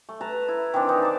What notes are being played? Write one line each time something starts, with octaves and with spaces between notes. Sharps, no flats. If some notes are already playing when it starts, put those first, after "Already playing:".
A3
B4 A5 A#5
E4
D#3 E3 C4 D4
D#4
D5 A5